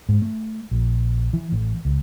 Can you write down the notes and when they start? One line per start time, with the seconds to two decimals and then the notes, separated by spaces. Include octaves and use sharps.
0.09 G#2
0.22 A3
0.71 A#1
1.33 E3
1.52 A1
1.85 C#2